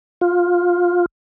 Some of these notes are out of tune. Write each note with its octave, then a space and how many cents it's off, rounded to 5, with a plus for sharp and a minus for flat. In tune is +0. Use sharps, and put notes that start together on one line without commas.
F4 +15